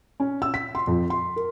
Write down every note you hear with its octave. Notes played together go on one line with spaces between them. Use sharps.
C#4
E6
B6
C6
F2
C6
A#4